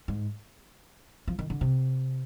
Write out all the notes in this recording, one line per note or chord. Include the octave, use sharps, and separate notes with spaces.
G#2
F3
D#3
D3
C3